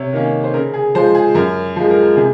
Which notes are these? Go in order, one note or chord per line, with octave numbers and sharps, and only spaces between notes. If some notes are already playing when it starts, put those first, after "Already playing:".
Already playing: C3 C#5
D#3 A#3 C#4
C5
C#3 A#4
G#4
F3 G#3 C5
G#4
F#2 A#4
F3 G#3
A#4
C3 G#4